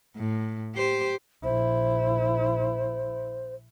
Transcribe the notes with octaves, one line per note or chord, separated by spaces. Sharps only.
A2
G4 C5
A#1 E4 C5